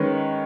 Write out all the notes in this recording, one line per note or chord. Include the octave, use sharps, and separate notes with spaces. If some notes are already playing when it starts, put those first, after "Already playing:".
Already playing: D#3 G#3 C#4 B4 C#5